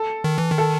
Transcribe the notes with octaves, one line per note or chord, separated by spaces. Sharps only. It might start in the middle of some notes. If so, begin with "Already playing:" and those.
Already playing: A4
D#3
E3
D#3
A4